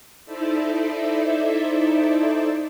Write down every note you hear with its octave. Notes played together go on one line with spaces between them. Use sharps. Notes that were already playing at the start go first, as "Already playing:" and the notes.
D#4 E4 A4 C5 D5 E5